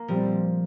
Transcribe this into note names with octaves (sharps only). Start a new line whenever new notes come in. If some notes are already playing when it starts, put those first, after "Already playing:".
Already playing: A#3
A#2 F3 G3 C4